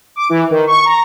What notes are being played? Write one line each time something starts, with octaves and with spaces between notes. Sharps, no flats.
D6
E3
D#3
C#6
A#5